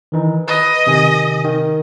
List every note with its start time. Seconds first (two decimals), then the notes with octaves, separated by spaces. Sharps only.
0.12 D#3 E3 D#4
0.48 B4 D#5
0.87 C3 D#3 G#5
1.44 D#3